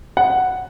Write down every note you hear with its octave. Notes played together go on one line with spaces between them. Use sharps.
F#5